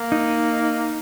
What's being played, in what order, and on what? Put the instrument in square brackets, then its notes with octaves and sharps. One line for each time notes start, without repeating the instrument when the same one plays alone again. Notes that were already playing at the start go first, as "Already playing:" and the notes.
Already playing: [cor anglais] A#3
[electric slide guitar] D#4